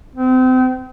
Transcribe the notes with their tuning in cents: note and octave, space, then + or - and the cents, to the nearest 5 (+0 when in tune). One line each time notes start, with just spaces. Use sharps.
C4 -35